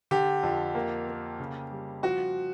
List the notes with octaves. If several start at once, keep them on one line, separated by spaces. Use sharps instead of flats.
D3 G4
F2
A#3
A#3
C#3
G3
F3 F#4